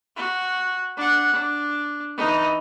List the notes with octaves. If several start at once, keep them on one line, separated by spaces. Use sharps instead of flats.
F#4
D4 F#5
D4
E3 D#4